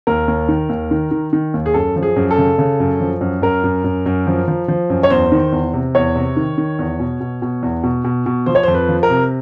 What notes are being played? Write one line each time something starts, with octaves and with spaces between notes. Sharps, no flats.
D#2 A#4
D#2
D#3
D#2
D#3
D#3
D#3
D#2
G#4
F#2 A4
F3
G#4
F#2
A4
C#3
C#3
F#2
F3
F#2
F#2 A#4
F#2
F#2
F#2
F3
F3
F3
F#2
C#5
E2 C5
D#3
E2
C3
E2 C#5
C3
D#3
D#3
E2
B2
B2
B2
E2
B2
B2
B2
F3 C5
C#5
C5
F2
B4
F3
A#4
C3